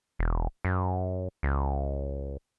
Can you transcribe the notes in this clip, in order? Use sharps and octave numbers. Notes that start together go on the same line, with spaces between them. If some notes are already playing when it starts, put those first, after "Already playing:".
E1
F#2
C#2